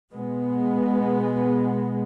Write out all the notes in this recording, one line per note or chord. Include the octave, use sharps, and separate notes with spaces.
B2 G#3 B3